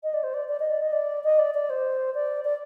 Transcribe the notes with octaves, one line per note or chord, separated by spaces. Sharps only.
D#5
D5
C5
D5
D5
D#5
D5
D#5
D5
D#5
D5
D5
C5
D5
D5